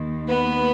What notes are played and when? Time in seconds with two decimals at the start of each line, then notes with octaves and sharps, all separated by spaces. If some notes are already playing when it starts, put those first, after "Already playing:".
Already playing: D#2 D#3 A#3
0.29 B3 B4